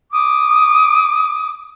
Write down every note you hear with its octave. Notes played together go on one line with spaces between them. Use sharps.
D6 D#6